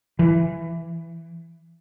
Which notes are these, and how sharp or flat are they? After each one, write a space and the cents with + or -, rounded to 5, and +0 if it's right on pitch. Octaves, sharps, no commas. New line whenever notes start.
E3 +15